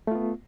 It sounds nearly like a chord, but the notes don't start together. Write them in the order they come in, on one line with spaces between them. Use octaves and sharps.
A3 F4 B3